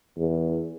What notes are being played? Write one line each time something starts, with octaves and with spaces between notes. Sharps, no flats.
E2